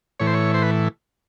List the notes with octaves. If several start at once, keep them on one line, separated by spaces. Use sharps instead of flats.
A2 E3 C#5
C5
C#5
C5
B4